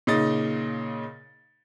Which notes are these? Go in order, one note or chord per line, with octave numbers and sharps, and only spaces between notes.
A#2 C#3 D#4 D#5 A6